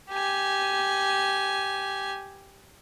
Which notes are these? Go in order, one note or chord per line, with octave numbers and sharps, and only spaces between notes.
G4 G#5